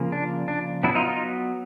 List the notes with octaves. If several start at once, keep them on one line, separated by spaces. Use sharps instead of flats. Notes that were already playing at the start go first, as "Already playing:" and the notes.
Already playing: C#3 F3 A#3
D4
D4
F#3 B3 D4 E4
D#4 F4
D#4 F4